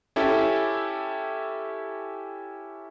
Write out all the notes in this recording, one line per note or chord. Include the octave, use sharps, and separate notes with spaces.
C#4 E4 G4 A4